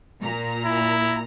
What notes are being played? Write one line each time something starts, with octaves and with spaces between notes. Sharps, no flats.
A#2 A#5
E4